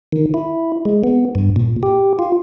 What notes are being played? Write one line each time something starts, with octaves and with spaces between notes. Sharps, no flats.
D#3
E4
G#3
B3
G2
A#2
G4
F4